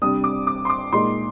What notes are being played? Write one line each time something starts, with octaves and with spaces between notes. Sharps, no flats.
C3 G3 D4 D#6
D6
D6
C6
D6
A#2 G#3 D#4 C6